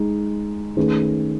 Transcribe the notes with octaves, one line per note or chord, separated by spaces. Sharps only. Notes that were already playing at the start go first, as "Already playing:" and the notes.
Already playing: G#3 D#4
D#3 A3 C#4 G#4 B4